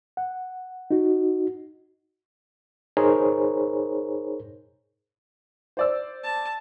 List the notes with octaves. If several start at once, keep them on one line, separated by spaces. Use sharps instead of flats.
F#5
D#4 F#4
D#4 G#4 A#4 C5 C#5
C5 D5 E6
A5